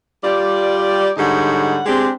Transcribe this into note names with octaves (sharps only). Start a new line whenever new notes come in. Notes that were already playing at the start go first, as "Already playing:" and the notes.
G3 F4 G4 D5
G#2 D3 G3 C#5 D#5 F#5
G#3 C4 D4 G4